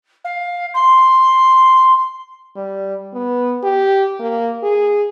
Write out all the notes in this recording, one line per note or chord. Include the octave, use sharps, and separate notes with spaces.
F5
C6
G3
B3
G4
A#3
G#4